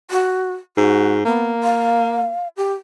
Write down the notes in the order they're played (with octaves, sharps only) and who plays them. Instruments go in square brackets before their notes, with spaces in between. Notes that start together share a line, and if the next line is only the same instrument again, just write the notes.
[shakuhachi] F#4
[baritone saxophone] G#2 [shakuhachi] F#4
[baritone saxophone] A#3 [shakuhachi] B3
[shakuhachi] F5
G4